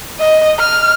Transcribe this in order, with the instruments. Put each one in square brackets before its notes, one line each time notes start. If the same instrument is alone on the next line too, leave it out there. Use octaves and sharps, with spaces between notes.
[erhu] D#5
F6